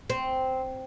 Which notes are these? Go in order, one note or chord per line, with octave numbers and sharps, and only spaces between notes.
C4